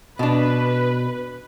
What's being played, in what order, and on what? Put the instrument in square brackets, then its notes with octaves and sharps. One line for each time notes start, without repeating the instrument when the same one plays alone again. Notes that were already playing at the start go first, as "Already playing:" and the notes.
[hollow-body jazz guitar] B2 D4 [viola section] B4